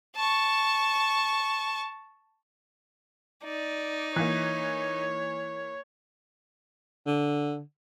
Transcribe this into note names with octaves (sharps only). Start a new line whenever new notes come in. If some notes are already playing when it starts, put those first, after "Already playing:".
A5 C#6
D#4 D5
E3 A#3 C#5
D3